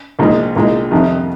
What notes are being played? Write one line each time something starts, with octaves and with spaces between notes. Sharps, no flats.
C2 A#2 F3 G#3 D#4
C2 A#2 G#3 D#4
F2 C3 D#3